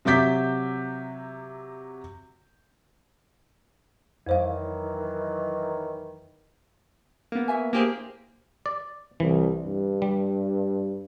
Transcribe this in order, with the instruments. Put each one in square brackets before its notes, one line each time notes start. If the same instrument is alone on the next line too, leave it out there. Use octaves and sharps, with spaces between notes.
[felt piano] C3 F#3 E5 D6 G6 B6
[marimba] F2 C5 F5 [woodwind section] D#3 E3 F#3
[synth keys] A#3 B3
[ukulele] F#4 E5 G#5
[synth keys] A#3 G4 G#4 [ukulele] D4 E4 C5
[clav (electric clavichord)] D5
[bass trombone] C2 [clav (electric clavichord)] E3
[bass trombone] G2
[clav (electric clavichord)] G3